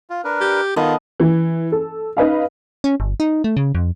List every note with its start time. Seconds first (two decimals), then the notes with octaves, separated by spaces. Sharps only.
0.10 F4
0.24 D4 A#4 B4
0.41 G4
0.76 D#3 B3 F4 A4 D#5
1.20 E3
1.72 A4
2.17 D#4 B4 D#5 F5
2.84 C#4
3.00 G1
3.20 D#4
3.44 A3
3.57 C#3
3.75 F2